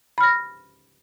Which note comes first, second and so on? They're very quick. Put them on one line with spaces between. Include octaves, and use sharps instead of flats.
B5 F6 A#6